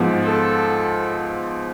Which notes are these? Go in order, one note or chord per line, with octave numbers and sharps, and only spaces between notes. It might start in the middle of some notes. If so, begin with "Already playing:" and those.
Already playing: G#2 F3 B3
A4